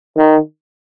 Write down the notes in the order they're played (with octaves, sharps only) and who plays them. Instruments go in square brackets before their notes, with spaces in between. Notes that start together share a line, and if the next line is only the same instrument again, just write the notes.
[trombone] D#3